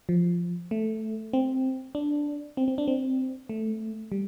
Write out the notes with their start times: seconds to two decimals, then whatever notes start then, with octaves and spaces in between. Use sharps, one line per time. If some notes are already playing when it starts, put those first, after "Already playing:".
0.09 F3
0.71 A3
1.33 C4
1.95 D4
2.57 C4
2.68 C4
2.78 D4
2.88 C4
3.49 A3
4.12 G3